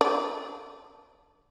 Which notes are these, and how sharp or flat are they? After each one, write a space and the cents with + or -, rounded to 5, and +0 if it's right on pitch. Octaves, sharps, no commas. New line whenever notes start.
D4 +0 D5 -30